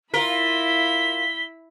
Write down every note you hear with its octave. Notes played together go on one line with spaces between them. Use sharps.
E4 F4 A#4 B5 B6 G7